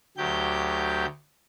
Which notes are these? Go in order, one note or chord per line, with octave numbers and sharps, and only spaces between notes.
D2 F#3 G4 G6